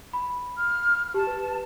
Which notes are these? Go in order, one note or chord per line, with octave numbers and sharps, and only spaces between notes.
B5
F6
G4 A5
B4